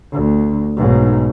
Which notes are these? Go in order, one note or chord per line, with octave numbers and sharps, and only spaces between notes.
D2
B1 G#2